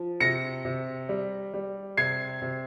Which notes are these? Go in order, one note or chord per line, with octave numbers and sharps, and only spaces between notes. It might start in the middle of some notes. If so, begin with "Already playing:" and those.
Already playing: F3
C3 A#6 C#7
C3
G3
G3
C3 G#6 C7
C3